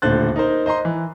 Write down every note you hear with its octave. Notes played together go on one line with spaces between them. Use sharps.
D#1 A2 D3 C5 F#6 A6
D#4 A#4 C5
C5 D#5 A#5 C6
E3